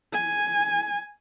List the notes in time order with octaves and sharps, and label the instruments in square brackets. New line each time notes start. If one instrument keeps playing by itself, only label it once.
[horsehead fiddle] G#5